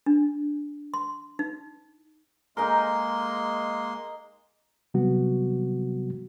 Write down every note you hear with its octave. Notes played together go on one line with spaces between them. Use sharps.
D4
C6
D#4
G#3 A#3 D#4 G#4 A#4 C6
C3 D#3 F#3 G3 B3 F#4